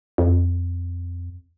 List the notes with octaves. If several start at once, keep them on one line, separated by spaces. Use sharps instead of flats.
F2